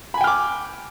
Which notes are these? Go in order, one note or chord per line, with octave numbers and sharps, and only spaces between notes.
G5 G#5 B5 D6 F6